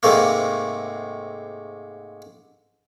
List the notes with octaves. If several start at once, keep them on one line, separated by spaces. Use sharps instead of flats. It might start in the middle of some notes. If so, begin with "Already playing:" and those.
G#2 C3 A3 A#3